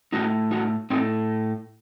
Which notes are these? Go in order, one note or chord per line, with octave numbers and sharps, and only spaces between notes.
A2 A3 D#4 F#4
D#4 F#4
A2 A3 C4 D#4